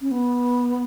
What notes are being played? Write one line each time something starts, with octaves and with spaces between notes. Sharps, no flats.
C#4
B3